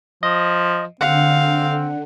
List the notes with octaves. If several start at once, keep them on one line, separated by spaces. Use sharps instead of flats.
F3 D#5
D3 C4 F5 F#5